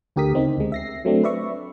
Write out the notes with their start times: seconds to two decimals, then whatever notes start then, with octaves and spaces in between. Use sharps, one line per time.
0.16 D2 D3 G4 A#4 D#6 B6
0.34 C#3 C4 D#4
0.57 D2 G#3
0.72 E5 A#6 C7
1.05 F#3 A3 C4 D4
1.24 B4 D5 E5 C#6